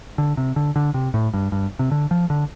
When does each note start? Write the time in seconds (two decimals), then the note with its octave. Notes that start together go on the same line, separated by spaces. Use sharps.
0.18 D3
0.37 C3
0.56 D3
0.76 D3
0.94 C3
1.14 A2
1.34 G2
1.52 G2
1.79 C3
1.91 D3
2.11 F3
2.30 D3